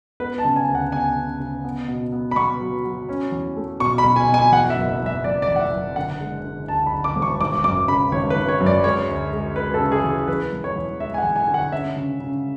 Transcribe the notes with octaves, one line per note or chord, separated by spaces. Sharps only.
B3 B4
A5
C#3
G#5
D2
F#5
B3 G#5
C#3
C#3
B3
B2
B3
B5
B3 C#6
F#3
F#3
C#4
E2
A3
B2 C#6
B5
B2
G#5
B2
G#5
E2 F#5
F#5
E5
F#1
E5
F#1
E5
F#1 D5
D5
E2
F#5
E5
F#1
D3 F#5
G#3
D3
D2 A5
B5
D3
D6
E1
C#6
G#1 D6
F#2 D6
C#3 B5
G#1 C#5
B4
G#1
C#5
F#2
D5
G#3 C#5
D2
G#3
G#3 B4
A4
C#3
G#4
E3
G#4
E2 B4
E1
C#5
E2
G#3 E5
G#5
F#5
E2
G#5
D3
F#5
C#4 E5
C#3
C#3